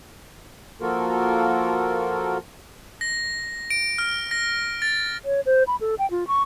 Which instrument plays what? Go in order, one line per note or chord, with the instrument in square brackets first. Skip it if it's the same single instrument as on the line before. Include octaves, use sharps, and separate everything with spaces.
[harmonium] F3 A#3 F4 F#4 A4 A#4
[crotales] A#6
D7
F6
A#6
A6
[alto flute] C#5
C5
B5
A4
G5
F4
C#6